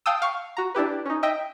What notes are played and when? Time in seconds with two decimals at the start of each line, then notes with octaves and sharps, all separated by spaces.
0.06 F5 G5 A5 D#6 E6
0.22 F5 C#6
0.57 F#4 A#5
0.74 D4 E4 G4 B4
1.06 C#4 D#4
1.23 D#5 E5 G5